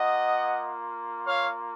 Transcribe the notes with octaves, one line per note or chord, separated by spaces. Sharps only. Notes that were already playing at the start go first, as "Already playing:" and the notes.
Already playing: A#3 F4 D#5 F#5
C#5 F5